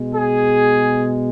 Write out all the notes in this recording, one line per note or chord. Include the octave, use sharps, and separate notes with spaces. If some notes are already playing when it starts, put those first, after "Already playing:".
Already playing: B2 G#3
G#4